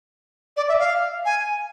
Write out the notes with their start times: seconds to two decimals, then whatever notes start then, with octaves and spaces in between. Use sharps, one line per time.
0.57 D5
0.69 E5
0.79 F5
1.25 G#5